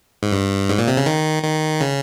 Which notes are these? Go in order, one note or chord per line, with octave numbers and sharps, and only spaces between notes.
G#2
G2
G#2
A#2
C3
C#3
D#3
D#3
C#3